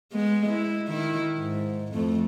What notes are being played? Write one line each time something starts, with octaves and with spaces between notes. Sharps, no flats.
G#3 B3
E4
D#3 E4
G#2
F2 A3